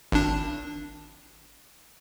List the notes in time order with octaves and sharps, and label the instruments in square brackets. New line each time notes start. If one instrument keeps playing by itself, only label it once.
[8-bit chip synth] G#1 D4